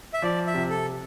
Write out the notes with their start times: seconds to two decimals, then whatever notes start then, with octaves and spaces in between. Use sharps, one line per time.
0.14 E5
0.22 F3 D5
0.47 E5
0.54 C3
0.70 A4